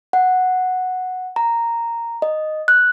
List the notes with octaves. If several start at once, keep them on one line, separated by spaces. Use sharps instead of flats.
F#5
A#5
D#5
F#6